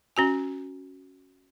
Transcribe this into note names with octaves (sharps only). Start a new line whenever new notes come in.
C#4 F#4 G#5